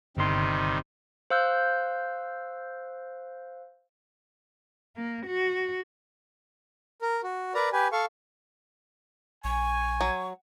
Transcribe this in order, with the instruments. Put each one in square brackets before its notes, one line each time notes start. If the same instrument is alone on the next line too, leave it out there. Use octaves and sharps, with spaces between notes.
[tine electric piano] G1 C6 [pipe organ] C3 D#3 G3
[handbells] C5 F5 E6 F#6 G6
[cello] A#3
F#4
[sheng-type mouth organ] A#4
F#4
A#4 B4 D5 A#5
G4 B4 G#5
A4 F5 C#6
[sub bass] A#1 [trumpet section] G#5 [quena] C#6
[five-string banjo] F#3